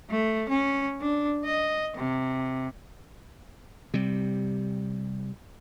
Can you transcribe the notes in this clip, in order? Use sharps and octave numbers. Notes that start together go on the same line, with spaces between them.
A3
C#4
D4
D#5
C3
C3 G3